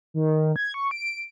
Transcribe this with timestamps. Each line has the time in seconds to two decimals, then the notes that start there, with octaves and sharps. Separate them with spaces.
0.14 D#3
0.56 G#6
0.74 C#6
0.91 D7